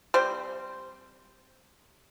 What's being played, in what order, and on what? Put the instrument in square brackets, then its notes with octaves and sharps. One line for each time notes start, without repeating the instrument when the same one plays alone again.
[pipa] G3 C4 C5